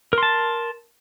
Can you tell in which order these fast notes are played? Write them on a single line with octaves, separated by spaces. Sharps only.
A#4 C6 A5